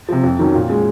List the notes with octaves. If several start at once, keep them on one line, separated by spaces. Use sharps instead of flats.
C3 F3
F2
D#3 F#3 C#4
A#2
G#3 C#4